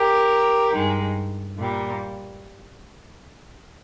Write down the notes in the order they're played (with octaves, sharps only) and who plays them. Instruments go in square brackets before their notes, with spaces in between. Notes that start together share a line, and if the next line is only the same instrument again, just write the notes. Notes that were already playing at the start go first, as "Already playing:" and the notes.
Already playing: [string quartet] G4 A#4
G2 D#3 G#3
A#2 G3